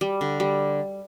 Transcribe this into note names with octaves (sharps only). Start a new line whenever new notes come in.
G3
D3
G3